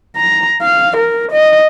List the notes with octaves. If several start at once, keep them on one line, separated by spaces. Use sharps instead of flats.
A#5
F5
A#4
D#5